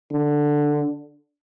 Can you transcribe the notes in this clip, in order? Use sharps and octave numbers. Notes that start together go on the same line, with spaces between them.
D3